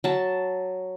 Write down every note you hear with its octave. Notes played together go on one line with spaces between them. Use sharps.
F#3 A5